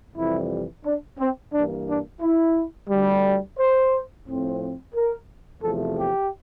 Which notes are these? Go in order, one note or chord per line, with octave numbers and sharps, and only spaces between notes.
F2 C3 E3 G3 E4
D4
C4
G2 E3 A#3 D4
D4
E4
D2 D3 G3
C5
A2 F3 C4
A#4
E2 C3 F3 A3 A4
G4